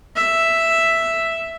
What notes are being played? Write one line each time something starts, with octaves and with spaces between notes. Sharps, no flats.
E5